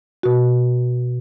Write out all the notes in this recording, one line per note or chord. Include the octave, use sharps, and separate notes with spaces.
B2 F#4